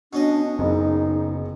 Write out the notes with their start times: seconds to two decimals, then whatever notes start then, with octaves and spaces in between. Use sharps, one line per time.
0.13 B2 C#4 D4 D#5
0.59 F#1 C#3 D#4